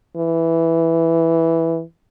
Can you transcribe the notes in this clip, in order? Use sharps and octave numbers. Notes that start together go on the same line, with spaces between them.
E3